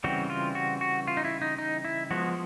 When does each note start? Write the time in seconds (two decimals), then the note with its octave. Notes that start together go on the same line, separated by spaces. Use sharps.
0.04 C#3 E3 G3 C4 F#4
0.30 F4
0.55 F#4
0.81 F#4
1.08 F4
1.17 D#4
1.25 E4
1.42 D#4
1.59 D#4
1.85 E4
2.11 F3 G#3 B3 F#4